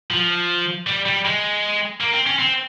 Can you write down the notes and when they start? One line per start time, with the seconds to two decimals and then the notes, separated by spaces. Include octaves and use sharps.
0.11 F3
0.87 G3
1.06 G3
1.25 G#3
2.01 A#3
2.14 C4
2.27 C#4
2.39 C4